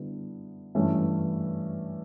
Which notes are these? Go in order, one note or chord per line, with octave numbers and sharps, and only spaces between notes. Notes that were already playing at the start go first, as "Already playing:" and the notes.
Already playing: D3 G3 B3 E4
G2 E3 A3 C#4